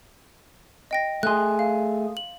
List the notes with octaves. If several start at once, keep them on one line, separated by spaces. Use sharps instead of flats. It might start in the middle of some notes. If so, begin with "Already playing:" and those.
D#5 G5 A#6
A3 G#4 C6 F#6
F5
F#7